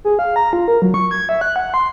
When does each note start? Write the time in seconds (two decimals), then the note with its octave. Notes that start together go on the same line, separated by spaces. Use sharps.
0.05 G#4
0.19 F5
0.36 A#5
0.53 F4
0.68 A#4
0.82 F#3
0.94 C#6
1.11 G#6
1.29 E5
1.41 F#6
1.56 F#5
1.74 C6